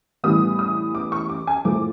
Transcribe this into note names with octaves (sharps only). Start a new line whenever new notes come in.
A2 E3 G3 B3 D#6
D#6
D6
C#6
D6
G#5
A2 F3 A3 D6